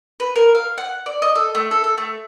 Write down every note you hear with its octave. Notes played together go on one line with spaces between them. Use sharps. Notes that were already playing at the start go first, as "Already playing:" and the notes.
B4
A#4
F5
F#5
D5
D#5
A4
A3
A4
A4
A3